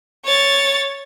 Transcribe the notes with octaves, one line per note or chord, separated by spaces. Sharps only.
C#5 A6